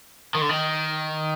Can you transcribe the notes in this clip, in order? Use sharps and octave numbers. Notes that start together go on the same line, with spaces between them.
D#3
D3
D#3